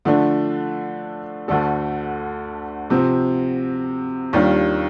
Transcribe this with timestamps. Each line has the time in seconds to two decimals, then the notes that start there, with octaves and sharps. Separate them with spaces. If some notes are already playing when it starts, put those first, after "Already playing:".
0.05 D3 F3 A3 D4
1.48 D2 D3 A3 D4 A4
2.90 C3 F3 C4
4.33 D#2 D#3 G3 D4 F4